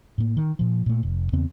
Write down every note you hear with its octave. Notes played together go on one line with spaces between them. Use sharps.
A2 A#3
D#3
A#2 F3
A#2 A3
F1
E2 C#3 B3 C4